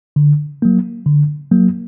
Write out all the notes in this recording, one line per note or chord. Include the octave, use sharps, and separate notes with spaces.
D3
F#3 A#3
D3
F#3 A#3